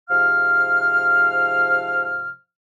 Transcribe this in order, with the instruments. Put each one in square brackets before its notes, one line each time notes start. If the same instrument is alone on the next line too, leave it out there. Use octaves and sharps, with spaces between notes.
[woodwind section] G#2 C3 F3 F5 F6